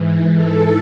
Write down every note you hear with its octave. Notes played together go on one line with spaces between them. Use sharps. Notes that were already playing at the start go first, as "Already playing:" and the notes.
Already playing: G#2 E3
A4